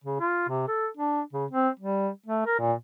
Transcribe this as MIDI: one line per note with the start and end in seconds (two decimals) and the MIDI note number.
0.04 0.20 49
0.20 0.49 65
0.49 0.63 48
0.68 0.87 69
0.97 1.21 62
1.33 1.45 49
1.51 1.69 60
1.79 2.09 55
2.26 2.46 57
2.46 2.58 70
2.60 2.73 46